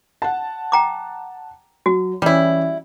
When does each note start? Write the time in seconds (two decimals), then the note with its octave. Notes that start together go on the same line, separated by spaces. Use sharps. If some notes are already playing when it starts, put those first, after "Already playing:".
0.22 F#5 A5
0.72 G5 A#5 D6
1.86 F#3 F#4
2.22 E3 G3 C#4 E4